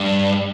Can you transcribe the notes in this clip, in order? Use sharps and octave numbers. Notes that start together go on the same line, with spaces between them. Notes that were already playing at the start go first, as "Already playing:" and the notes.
Already playing: G2